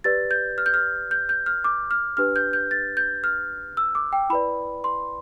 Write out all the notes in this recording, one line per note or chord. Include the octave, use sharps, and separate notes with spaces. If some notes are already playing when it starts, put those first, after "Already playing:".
G4 B4 D5 A6
G6
F6
G6
F6
G6
G6
F6
D6
F6
D4 G4 B4 F6
G6
G6
A6
G6
F6
E6
D6
G5
E4 B4 D5 B5
C6